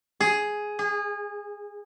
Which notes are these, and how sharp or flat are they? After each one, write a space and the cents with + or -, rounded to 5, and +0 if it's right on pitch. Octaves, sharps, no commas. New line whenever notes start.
G#4 +5
G#4 -25